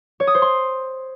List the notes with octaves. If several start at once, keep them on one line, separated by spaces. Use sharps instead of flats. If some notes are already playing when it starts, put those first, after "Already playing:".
C#5
D#6
C5
C6